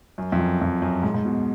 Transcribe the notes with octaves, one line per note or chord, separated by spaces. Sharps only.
F#2
F2
F#2
F2
F#2
G#2
G#2
B2